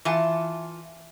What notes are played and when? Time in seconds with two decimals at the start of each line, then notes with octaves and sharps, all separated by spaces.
0.05 E3 F4 A5